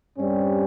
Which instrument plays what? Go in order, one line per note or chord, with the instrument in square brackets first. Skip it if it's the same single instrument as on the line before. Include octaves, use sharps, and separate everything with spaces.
[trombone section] G2 G3 C4 C#4